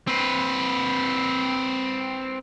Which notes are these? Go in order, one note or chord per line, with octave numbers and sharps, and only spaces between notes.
C4 B4